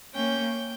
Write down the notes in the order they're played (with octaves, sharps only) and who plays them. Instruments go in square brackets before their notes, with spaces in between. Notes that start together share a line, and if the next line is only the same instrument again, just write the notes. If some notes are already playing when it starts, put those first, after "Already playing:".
[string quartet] A#3 C#4 [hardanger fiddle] G5